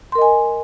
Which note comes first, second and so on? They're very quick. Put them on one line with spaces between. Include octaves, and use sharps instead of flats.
C6 A#4 D#5 G#5